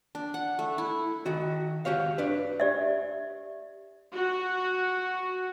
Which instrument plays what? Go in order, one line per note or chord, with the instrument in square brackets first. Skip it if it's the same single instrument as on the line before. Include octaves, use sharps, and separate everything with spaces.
[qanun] D4
F#5
A3
E4
[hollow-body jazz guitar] D#3 F#4
F#4 G4 C#5 F5
D4 B4
[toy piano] G4 D5 E5
[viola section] F#4